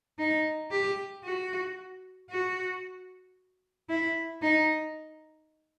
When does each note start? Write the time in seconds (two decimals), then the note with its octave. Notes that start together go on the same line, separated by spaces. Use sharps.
0.18 D#4
0.71 G4
1.24 F#4
2.30 F#4
3.89 E4
4.42 D#4